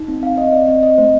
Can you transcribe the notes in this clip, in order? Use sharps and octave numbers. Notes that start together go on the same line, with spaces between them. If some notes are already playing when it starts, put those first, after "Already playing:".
Already playing: D#4
C4
C4 F5
C4 D#5
C4 D5
C4 D#5
C4 D#5
A3 C5